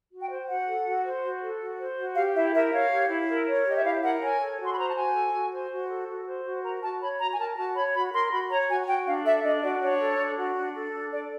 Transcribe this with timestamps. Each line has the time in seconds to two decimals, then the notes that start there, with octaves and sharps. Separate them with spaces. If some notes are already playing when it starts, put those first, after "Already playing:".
0.11 F#4
0.20 G5
0.30 C5
0.49 F#4 F#5
0.67 A4
0.85 F#4
1.04 C5
1.23 F#4
1.42 A4
1.60 F#4
1.79 C5
1.98 F#4
2.16 G4 F5
2.34 E4 E5
2.53 A#4 E5
2.72 C#5 F5
2.91 G4
3.09 E4
3.28 A#4
3.46 C#5
3.65 G4 D#5
3.76 E5
3.84 E4 F5
4.03 A#4 F#5
4.22 C#5 G#5
4.40 A4
4.59 F#4 C6
4.72 B5
4.77 C5 A#5
4.88 A5
4.96 F#4 G#5
5.15 A4
5.33 F#4
5.52 C5
5.71 F#4
5.89 A4
6.08 F#4
6.27 C5
6.45 F#4
6.64 A#4 A#5
6.82 F#4 A5
7.01 C#5 B5
7.20 F#4 A#5
7.31 G#5
7.39 A#4 A5
7.57 F#4 A5
7.76 C#5 B5
7.94 F#4 B5
8.13 A#4 C6
8.32 F#4 B5
8.51 C#5 A#5
8.69 F#4 G#5
8.87 F#4 G5
9.06 D4 F5
9.24 A4 E5
9.43 D4 D#5
9.62 F#4 D5
9.81 D4 C#5
10.00 A4
10.18 D4
10.37 F#4
10.56 D4
10.74 A4
10.93 D4
11.12 A4 D5